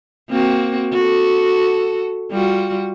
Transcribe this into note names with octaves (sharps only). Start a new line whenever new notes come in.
A#3 C4 F#4
F#4 A4
G3 F4 F#4